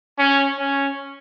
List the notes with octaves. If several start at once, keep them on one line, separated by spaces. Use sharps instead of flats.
C#4
C#4